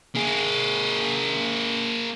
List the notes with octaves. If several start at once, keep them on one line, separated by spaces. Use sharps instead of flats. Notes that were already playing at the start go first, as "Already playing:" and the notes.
A#3 G#4